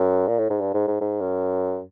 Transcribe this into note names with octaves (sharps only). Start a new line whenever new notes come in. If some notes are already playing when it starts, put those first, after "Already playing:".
Already playing: F#2
A#2
A2
G#2
G2
G#2
G#2
G#2
F#2